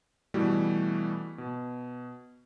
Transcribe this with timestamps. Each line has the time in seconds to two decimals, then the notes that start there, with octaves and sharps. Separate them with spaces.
0.34 B2 E3 G3 A3 F#4
1.38 B2